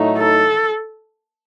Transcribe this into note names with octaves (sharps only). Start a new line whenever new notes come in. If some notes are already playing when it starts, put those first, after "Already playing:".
Already playing: A2 F#3 A3 D#4
A4